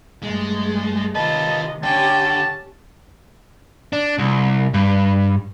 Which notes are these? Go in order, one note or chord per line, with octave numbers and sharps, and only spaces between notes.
G2 G#3 A3
C3 D#3 F4 B4 D#5 A5
D3 C#4 G4 G5 A5
D4
C2
G2